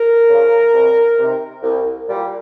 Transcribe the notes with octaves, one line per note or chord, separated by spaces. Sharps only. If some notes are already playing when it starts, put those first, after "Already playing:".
Already playing: A#4
C#3 F3
C2
C3 D#3
C2
A#2 G3